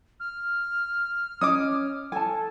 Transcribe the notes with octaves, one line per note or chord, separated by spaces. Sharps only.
F6
C#4 D#5 D6 D#6
A4 G#5 A5